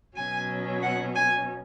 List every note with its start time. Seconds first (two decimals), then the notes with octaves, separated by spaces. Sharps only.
0.16 B2 F#3 C#4 G#5
0.82 F#5
1.15 G#5